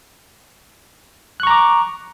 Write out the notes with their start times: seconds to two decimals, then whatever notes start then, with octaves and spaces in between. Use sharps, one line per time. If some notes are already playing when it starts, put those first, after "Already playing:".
1.40 F#6
1.43 C#6
1.47 A#5
1.51 D6